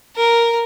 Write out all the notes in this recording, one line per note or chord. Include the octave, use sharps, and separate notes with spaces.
A#4